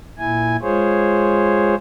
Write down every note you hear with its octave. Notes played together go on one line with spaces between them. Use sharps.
A#2 E4 G#5
G#3 F4 G#4 C5 C#5